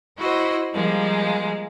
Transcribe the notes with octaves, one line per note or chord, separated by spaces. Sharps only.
E4 F#4 C5 D#5
F3 G3 G#3 A#3